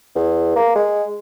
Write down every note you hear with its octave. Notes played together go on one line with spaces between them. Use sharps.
E2
A#3
G#3